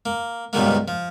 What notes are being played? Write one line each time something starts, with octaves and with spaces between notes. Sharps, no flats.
A#3
C#2 G2 B2 D#3 G#3 A#3
F3